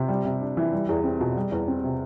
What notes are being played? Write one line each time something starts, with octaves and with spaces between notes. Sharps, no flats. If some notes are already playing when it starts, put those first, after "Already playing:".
Already playing: C3
G3
C3
D4
E3
G3
E2
C4
B2
G3
E2
C4
C3